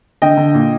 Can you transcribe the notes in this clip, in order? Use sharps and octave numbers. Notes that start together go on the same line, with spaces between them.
D3 D#5 G5
D3
A#2